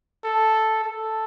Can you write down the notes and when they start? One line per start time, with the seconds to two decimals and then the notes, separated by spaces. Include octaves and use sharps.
0.24 A4
0.84 A4